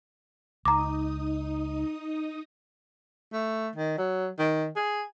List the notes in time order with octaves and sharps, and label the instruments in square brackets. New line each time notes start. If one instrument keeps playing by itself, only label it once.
[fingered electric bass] C#2 [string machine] D#4 D#6 [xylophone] A#5 D6
[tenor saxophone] A3
D#3
F#3
D#3
G#4